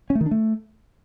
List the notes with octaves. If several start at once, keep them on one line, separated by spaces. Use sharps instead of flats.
C#4
A3
D#3
D4
A3